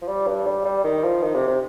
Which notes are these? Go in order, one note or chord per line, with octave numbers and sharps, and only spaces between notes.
F3
G3
G2
G3
G3
D#3
F3
D#3
C3
C3